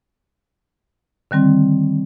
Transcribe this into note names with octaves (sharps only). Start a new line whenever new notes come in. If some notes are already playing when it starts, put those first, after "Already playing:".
D3 D#3 G3 C4